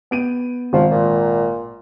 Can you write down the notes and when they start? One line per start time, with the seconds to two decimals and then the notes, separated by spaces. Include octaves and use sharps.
0.11 B3 D7 D#7
0.73 G#1 F3
0.91 A#2